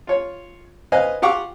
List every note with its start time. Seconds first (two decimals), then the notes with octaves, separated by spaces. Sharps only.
0.07 F4 C#5
0.92 B4 C5 D#5 F5 G#5 F#6
1.22 F4 G4 F5 F#5 C#6 D6